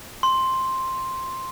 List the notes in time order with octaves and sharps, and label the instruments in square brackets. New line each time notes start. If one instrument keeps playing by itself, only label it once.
[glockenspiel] C6